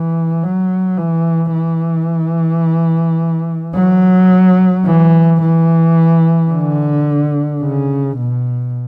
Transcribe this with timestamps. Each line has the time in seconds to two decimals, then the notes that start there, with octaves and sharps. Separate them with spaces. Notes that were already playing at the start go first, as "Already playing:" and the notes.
Already playing: E3
0.43 F#3
0.98 E3
1.54 E3
3.75 F#3
4.85 E3
5.41 E3
6.51 D3
7.62 C#3
8.17 B2